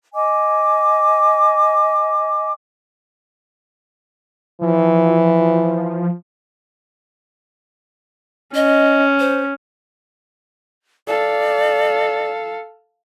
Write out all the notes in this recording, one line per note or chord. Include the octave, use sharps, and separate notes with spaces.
D#5 G#5 D6
E3 F3
C#4 D#5
C5
A4 D5 F5